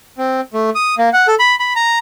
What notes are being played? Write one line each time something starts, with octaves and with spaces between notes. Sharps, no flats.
C4
A3
D#6
A#3
F#5
A4
B5
B5
A#5